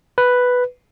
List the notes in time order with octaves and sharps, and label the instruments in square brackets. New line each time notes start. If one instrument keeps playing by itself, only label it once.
[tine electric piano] B4